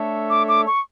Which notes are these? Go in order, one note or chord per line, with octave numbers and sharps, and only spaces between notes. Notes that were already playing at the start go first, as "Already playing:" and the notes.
Already playing: A3 D4 A4 C#5 E5
D6
D6
C#6